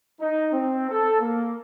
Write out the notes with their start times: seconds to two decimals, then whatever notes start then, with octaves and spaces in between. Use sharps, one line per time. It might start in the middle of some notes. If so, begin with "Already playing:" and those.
0.21 D#4
0.53 C4
0.90 A4
1.20 A#3